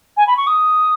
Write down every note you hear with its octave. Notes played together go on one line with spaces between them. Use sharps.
G#5
B5
C#6
D#6